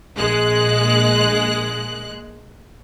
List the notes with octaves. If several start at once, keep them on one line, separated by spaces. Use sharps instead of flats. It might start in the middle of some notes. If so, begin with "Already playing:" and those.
A#1 G#3 F#6